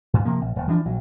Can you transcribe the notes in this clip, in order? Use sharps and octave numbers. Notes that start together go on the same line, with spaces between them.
G2
C3 F3 A#3
A#1
D#1
E3 F3 A#3 D4
A#1 F#3